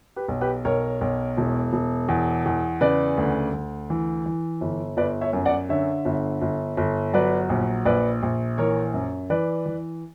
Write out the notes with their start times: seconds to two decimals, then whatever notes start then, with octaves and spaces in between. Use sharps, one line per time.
0.16 G4 B4
0.28 B1
0.41 G4 B4
0.65 B1 A#4 C#5
1.01 B1
1.37 E1
1.73 E1
2.08 E2
2.46 E2
2.81 C#3 B4 D5
3.17 D2
3.53 D2
3.90 E3
4.26 E3
4.61 G1
4.97 G1 B4 D5
5.21 C#5 E5
5.33 F#2
5.46 D5 F#5
5.69 D3 C#5 E5
6.05 G1
6.41 G1
6.77 G1
7.13 F#3 B4 D5
7.50 A#1
7.85 A#1 B4 D5
8.23 A#1
8.58 E3 A#4 C#5
8.94 F#2
9.30 E3 B4 D5
9.66 E3